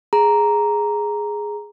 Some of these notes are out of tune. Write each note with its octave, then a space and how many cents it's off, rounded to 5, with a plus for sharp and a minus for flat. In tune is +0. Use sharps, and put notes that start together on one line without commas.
G#4 +0 A#5 +0